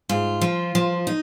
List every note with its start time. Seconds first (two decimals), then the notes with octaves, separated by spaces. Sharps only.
0.09 G#2 F4
0.41 F3
0.75 F3
1.07 D#4